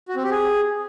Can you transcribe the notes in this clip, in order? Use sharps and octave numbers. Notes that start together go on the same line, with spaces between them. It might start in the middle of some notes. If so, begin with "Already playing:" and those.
F#4
C4
G4
G#4